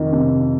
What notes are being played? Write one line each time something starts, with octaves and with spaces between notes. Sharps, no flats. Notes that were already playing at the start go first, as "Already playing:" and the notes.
Already playing: F2 D#3
C3